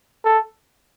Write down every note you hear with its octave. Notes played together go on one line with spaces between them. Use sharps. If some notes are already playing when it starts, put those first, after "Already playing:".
A4